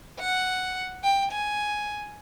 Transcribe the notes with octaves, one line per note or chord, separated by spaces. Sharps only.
F#5
G5
G#5